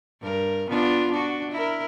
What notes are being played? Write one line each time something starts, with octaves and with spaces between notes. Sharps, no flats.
G2 A#4
B3 D4 F4
D4 F#4
E4 A#4